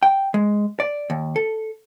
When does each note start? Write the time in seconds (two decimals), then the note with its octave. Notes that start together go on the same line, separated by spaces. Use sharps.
0.03 G5
0.34 G#3
0.80 D5
1.10 D#2
1.36 A4